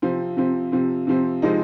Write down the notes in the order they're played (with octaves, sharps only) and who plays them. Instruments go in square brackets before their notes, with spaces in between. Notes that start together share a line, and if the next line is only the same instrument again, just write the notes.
[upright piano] C3 F3 C4
C3 F3 C4
C3 F3 C4
C3 F3 C4
C3 F3 G#3 C4 D#4